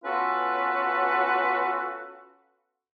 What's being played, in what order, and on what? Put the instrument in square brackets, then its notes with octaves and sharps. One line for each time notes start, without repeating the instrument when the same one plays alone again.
[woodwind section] B3 C#4 F4 F#4 A4 B4